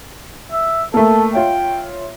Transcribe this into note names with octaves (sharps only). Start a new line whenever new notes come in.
E5
A3 A#3 A4
F4 C#5 E5 G5